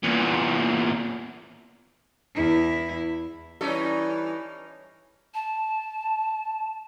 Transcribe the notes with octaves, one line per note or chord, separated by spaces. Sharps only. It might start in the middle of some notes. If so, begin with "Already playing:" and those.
E2 A#2
E2 E4
E3 G3 C#4 D#4 A4
A5